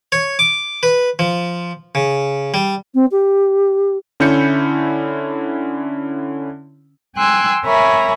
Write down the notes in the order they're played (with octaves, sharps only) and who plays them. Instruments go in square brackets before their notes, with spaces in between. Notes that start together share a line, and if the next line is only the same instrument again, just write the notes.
[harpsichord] C#5
D6
B4
F3
C#3
G3
[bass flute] C4
G4
[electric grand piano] D3 C#4 E4 G6 C#7
[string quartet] G5 G#5 C6 E6 F#6 G#6
A#4 C#5 E5 G#5 A#5 B5